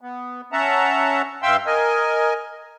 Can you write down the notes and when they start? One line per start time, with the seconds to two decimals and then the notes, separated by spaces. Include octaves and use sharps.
0.01 B3
0.52 C#4 E5 F#5 A5 A#5
1.43 G2 E5 F5 G5 C6 E6
1.66 A#4 D#5 G#5